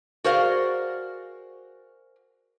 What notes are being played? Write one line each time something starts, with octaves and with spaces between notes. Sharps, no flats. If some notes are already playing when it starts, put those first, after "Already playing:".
F#4 G#4 A#4 C5 D5 F5